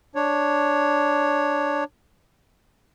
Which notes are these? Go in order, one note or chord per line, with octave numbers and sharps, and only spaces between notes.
D4 C#5